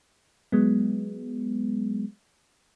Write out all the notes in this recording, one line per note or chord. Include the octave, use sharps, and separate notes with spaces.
F#3 G#3 B3